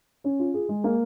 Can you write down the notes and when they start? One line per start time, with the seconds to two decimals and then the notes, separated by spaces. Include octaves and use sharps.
0.24 C#4
0.39 F4
0.54 G#4
0.69 G#3
0.84 A#3